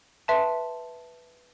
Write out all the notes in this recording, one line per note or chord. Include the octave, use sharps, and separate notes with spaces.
B4 E5 A5 C6